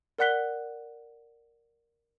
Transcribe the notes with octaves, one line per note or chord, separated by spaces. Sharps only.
A#4 D5 F#5 F#6 B6 G7